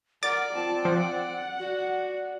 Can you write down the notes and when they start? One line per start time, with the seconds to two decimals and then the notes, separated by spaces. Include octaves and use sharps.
0.23 A#4 D5 F#5 D6 A6
0.53 C4 F4 A5
0.85 F3 F#5
1.59 F#4 D5